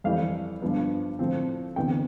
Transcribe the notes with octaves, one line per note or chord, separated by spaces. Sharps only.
F2 E3 G3 F5
G2 F3 B3
A2 F3 C4
D2 C3 E3 B3 G5